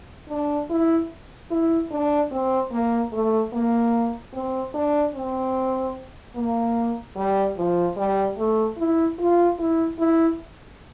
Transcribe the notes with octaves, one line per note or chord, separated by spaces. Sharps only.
D4
E4
E4
D4
C4
A#3
A3
A#3
C4
D4
C4
A#3
G3
F3
G3
A3
E4
F4
E4
E4